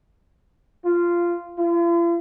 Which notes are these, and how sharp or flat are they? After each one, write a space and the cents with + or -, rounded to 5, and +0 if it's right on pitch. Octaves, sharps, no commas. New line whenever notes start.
F4 -10
F4 -45